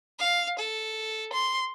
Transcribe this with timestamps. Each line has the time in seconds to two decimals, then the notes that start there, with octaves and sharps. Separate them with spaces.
0.19 F5
0.59 A4
1.33 C6